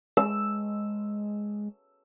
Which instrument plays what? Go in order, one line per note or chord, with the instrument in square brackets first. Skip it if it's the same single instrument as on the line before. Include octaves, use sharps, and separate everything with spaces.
[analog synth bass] G#3 [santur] E6